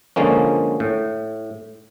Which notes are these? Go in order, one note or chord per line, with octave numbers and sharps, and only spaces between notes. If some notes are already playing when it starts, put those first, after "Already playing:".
D3 F3 G#3 A#3 C#4
A2